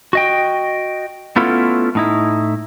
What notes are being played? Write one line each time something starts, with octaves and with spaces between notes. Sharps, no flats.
F#4 D#5 G5
A3 B3 C#4 E4 F4 A4
A2 D#4 E4